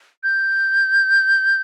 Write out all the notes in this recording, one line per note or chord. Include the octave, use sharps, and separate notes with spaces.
G6